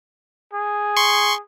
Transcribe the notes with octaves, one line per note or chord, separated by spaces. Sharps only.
G#4
C6 C#6